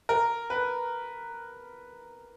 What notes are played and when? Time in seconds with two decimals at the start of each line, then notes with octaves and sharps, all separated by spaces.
0.09 A#4
0.50 B4